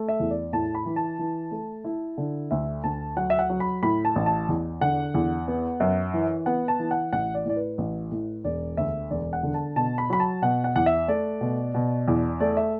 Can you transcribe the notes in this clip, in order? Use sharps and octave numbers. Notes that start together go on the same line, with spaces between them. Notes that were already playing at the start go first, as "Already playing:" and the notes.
Already playing: A3
E5
E2
D5
A2 A5
B5
E3
A5
E3
A3
E4
D3
D2 E5
D2 A5
F#3 F#5
E5
F#5
F#3
B5
A2 B5
A5
A1
A5
E2
D3 F#5
E2
B3
F#2
E3
B3 F#5
A5
E3
F#5
A1 F#5
D5
A2 D5
B4
A1
A2
E1 D5
D2 E5
E1 D5
F#5
D3
A5
B2 A5
B5
F#3 B5
A5
B2 F#5
F#5
E2 F#5
E5
A3 D5
B2
B2
E2
A3 D5
E5